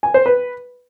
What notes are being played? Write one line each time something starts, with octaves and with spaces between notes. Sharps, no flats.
G#5
C5
B4